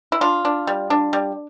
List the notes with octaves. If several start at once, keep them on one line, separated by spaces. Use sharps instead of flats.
E4
D4 F4
D4
G3
D4
G3